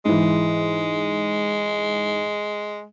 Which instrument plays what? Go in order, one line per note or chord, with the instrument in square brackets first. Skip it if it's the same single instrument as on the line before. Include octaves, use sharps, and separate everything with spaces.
[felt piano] G#2 E3 [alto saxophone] G#3